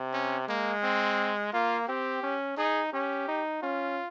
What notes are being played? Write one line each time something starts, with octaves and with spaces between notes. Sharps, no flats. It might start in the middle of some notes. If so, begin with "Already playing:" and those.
Already playing: C3
C#4
G#3 A#3
C4
A#3 F4
C4 G4
C#4
D#4 G#4
C#4 G4
D#4
C#4 F4